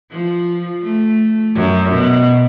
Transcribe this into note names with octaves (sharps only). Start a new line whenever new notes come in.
F3
A3
F#2
B2